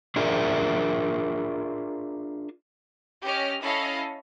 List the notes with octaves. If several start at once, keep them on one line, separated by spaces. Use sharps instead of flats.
D4 F4 G#4 A#4 D5 E5
C#4 G4 D#5 F6
C#4 E4 A4 D#5 F5 B5